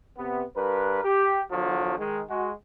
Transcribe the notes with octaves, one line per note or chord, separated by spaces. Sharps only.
C3 B3
G2 A#4 B4
G4
E2 D3 F3 F#3
D#3 G#3
G#3 F#4